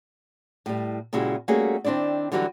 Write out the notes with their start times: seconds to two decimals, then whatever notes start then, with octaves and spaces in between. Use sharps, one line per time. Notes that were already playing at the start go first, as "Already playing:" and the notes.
0.66 A2 G3
1.13 A#2 C#3 G#3 E4 F#4 G4
1.48 G3 A3 A#3 C#4 F#4 G#4
1.84 D#3 C4 D4 E4 D5
2.32 D3 E3 F#3 G3 E4 F#4